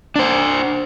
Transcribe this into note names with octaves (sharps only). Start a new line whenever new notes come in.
D4 C5